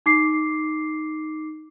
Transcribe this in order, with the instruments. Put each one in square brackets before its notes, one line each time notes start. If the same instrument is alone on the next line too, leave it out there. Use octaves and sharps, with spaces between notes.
[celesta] D#4 D6 C7